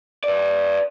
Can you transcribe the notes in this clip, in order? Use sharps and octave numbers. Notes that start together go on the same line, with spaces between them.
B4 D5